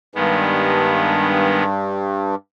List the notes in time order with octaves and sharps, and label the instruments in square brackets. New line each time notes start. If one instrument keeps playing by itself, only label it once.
[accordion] G2 [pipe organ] D#3 G#3 B3